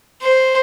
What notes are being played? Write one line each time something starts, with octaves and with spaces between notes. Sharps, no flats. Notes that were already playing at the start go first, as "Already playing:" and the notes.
C5